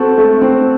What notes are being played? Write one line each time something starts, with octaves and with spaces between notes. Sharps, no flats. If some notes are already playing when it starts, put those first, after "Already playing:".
Already playing: C4 F#4 A4
A3
C4